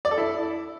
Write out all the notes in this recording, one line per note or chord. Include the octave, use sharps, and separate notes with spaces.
D5
A4
E4